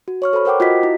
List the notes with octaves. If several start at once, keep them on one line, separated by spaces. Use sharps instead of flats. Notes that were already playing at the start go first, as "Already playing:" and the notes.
F#4
C#5 C#6 F6
A4 C5 B5 F6
A#4 C5 F#5 G5 D6
F4 F#4 D#5 B6
E4